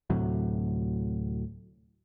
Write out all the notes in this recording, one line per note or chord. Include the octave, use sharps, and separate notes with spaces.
D2 A2 C3 F#3